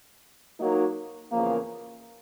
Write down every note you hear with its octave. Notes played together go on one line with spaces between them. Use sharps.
F#3 A#3 D#4
E2 C#3 F3 A#3